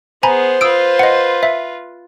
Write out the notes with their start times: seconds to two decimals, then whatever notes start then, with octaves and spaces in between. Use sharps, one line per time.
0.23 B3 G#4 C5 G#5 A#5 B5
0.61 F4 B4 D#6 E6 D7
0.99 D#5 F#5
1.43 E5